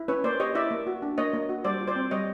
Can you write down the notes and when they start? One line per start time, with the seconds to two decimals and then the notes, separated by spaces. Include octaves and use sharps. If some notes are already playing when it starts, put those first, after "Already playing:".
Already playing: E4
0.08 C#4 B4 C#5
0.24 A#3 C5 D5
0.40 G4 C#5 D#5
0.55 E4 D5 E5
0.71 A#3
0.87 F#4
1.02 D4
1.18 A#3 C#5 D#5
1.34 A#3
1.49 F#4
1.64 G3 C5 D5
1.81 F4
1.88 C5 D5
1.96 C4
2.11 G3 C#5 D#5